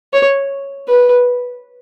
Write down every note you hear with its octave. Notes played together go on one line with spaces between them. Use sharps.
C#5
B4